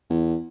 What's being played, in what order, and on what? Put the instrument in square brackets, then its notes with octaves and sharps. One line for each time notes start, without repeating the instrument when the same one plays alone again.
[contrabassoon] E2